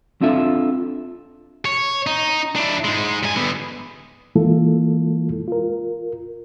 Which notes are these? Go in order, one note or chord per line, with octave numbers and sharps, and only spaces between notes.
C4 D4 F4 A4 E5
C#5
D#4
D4 E4
G#2 G#3
G3 G#5
D3 B3
E3 G#3 A#3 E4 F4 A4
F4 A#4